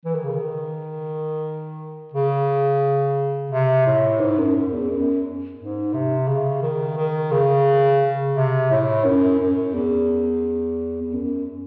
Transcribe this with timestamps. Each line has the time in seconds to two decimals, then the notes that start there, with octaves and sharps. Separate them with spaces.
0.05 E3
0.15 D#3
0.24 C#3
0.33 D#3
2.13 C#3
3.51 C3
3.86 A2
4.20 G#2
4.38 F#2
4.55 F#2
4.73 E2
4.90 F#2
5.59 G#2
5.94 C3
6.28 C#3
6.62 D#3
6.97 D#3
7.31 C#3
8.35 C3
8.71 A2
9.04 F#2
9.39 F#2
9.73 E2
11.02 E2
11.13 F#2